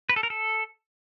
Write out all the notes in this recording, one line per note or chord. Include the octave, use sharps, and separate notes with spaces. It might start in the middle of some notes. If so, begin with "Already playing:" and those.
B4
A4
A#4
A4